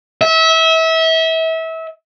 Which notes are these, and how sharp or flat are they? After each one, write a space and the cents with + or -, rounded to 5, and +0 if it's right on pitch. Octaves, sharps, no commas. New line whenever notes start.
E5 -30